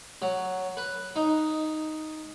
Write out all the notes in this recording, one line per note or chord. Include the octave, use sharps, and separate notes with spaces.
F#3
B4
D#4